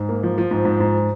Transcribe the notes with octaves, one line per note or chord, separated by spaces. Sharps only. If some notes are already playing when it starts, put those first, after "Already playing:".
Already playing: G#2
A#3
F3
F3
G#2
G#2
G#2